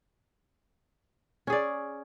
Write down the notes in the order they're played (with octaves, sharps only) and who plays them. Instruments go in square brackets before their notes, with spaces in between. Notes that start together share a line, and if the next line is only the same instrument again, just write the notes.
[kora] C#4
G#4
D5